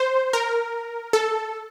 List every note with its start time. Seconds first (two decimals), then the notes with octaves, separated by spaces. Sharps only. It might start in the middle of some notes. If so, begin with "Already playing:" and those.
Already playing: C5
0.33 A#4
1.13 A4